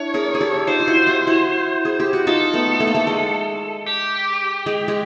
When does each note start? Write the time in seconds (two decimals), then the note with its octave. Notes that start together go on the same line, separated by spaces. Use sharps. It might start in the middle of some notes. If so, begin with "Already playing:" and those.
Already playing: D4 E4 C#5
0.14 G#4 A#4
0.35 G#4
0.41 G4 A4
0.67 D#4 F4 C5
0.80 F4
0.87 E4 F#4
1.07 F4 G4
1.27 E4 F#4
1.85 G#4
2.00 G4
2.13 F#4
2.27 D#4 F4 A4
2.53 A3 B3
2.80 A3
2.87 A#3
2.95 A3
3.07 G#3
3.86 G4
4.66 G#3
4.88 G#3